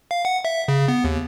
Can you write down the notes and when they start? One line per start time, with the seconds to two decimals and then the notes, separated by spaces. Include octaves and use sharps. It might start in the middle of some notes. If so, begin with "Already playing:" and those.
0.11 F5
0.25 F#5
0.45 E5
0.68 C#3
0.88 B3
1.04 D#2